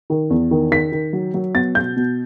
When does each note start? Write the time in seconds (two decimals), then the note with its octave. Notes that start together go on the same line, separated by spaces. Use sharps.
0.10 D#3
0.30 E2
0.51 D#3
0.71 D#3 B6
0.92 D#3
1.13 F#3
1.34 F#3
1.55 B3 A6
1.75 B2 G6
1.96 B2